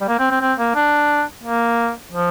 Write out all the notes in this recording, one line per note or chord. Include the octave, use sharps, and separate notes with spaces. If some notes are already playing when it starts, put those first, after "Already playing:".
G3
A#3
C4
C4
C4
A#3
D4
A#3
F3